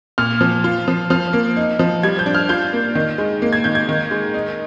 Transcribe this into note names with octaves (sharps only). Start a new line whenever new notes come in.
A#2 F6
F3
F4
F3
F3 F6
A#3
D#4
F3
G3 G#6
G6
D4
F6
F4 G6
A#3
D#3
G#3
A#3
G#6
D#3 G6
G#6
D#3
G#3
D#4